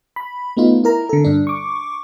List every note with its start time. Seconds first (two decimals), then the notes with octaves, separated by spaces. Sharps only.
0.16 B5
0.57 A3 B3 D#4 F4
0.84 E4 A#4 A#5
1.09 D3 A4
1.25 G2 D4
1.47 C#6 D6